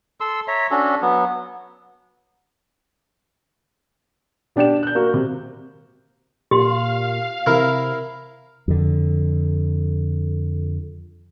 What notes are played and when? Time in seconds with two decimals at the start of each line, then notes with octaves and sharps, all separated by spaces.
0.21 A4 C6 E6
0.48 C#5 E5 A#5
0.71 C#4 D4 F#4 A4
1.02 F#3 B3
4.56 B2 D4 G4 D5 E7
4.83 F#6 G6
4.95 A#3 F#4
5.14 C3
6.51 A#2 G4 F5 C6
7.46 C3 E4 A#4
8.68 F2 D3